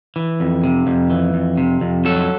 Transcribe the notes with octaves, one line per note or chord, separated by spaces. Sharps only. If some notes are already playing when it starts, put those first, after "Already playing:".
E3
F2
C3
F2
E3
F2
C3
F2
F#3 A4